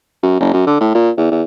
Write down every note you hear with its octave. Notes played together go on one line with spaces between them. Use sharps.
F#2
F#1
F#2
D3
A2
A#2
E2
E2